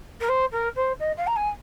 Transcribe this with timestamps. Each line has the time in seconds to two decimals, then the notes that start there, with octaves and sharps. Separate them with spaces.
0.20 A#4
0.29 C5
0.52 A#4
0.76 C5
1.00 D#5
1.17 F5
1.27 A#5
1.36 G#5